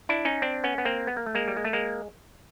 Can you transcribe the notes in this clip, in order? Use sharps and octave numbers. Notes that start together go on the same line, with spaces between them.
D4 E4
C#4 D#4
C4 D4
B3 C#4
B3
A#3 C4
B3
A#3
A3
G#3 A#3
G3
G#3
A3
G#3 A#3